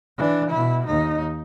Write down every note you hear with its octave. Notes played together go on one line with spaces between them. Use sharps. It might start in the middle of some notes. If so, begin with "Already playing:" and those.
E3 D4
B2 E4
D#2 D#4